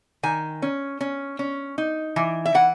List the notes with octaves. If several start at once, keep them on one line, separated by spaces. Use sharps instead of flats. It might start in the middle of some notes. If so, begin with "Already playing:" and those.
D#3 G#5
C#4
C#4
C#4
D#4
E3
E5
E3 F#5